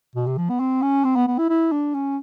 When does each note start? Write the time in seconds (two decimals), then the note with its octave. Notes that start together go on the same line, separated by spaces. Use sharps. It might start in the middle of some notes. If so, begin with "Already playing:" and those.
0.16 B2
0.27 C3
0.38 F3
0.50 B3
0.60 C4
0.82 C#4
1.05 C4
1.16 B3
1.28 B3
1.39 E4
1.50 E4
1.72 D4
1.94 C#4